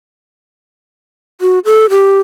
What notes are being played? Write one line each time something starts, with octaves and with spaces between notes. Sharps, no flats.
F#4
A4
G4